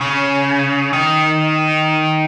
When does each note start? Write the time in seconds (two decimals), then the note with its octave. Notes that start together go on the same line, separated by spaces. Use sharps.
0.01 C#3
0.93 D#3